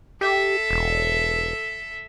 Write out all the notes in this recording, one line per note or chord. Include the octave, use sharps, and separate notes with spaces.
G4 A4 E5
E1